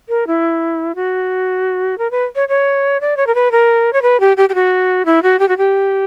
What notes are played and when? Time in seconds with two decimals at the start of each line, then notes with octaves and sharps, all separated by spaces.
0.09 A#4
0.27 E4
0.95 F#4
1.98 A#4
2.11 B4
2.35 C#5
2.48 C#5
3.01 D5
3.17 C#5
3.27 A#4
3.35 B4
3.51 A#4
3.93 C#5
4.02 B4
4.20 G4
4.37 G4
4.49 G4
4.55 F#4
5.05 E4
5.23 F#4
5.39 G4
5.48 F#4
5.57 G4